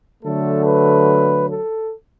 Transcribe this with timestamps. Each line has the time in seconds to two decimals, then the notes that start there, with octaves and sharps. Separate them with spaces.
0.23 D3 F#3 A3 A4
0.66 B4
1.50 A4